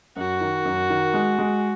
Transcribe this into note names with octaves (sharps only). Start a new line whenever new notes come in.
F#2 F#4
D#3
F#2
D#3
G#3
G#3